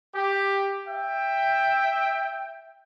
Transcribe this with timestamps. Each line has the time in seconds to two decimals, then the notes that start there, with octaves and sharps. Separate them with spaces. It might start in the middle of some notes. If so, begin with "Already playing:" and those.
0.14 G4
0.86 E5 G5